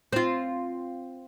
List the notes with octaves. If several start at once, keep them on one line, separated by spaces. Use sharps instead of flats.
C4 F4